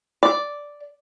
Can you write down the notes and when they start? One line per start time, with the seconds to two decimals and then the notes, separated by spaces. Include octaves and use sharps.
0.23 D5